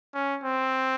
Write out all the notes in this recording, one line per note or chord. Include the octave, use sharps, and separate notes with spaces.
C#4
C4